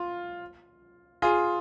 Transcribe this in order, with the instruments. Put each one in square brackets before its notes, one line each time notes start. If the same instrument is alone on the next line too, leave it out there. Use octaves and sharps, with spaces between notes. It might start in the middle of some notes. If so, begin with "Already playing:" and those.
Already playing: [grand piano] F4
F4 G#4